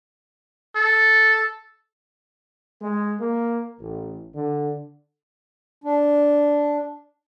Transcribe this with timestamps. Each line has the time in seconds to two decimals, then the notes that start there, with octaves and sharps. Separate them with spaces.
0.76 A4
2.80 G#3
3.20 A#3
3.79 A1
4.35 D3
5.84 D4